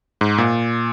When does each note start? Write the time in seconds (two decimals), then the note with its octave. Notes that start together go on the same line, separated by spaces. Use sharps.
0.21 G#2
0.38 A#2